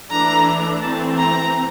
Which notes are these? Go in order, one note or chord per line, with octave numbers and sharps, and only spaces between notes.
E3 A3 D4 A#5
E3 A3 C4 A5
A#5